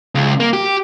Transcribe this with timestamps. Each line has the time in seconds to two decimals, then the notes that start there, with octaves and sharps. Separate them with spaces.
0.15 C#2
0.40 A#3
0.53 G4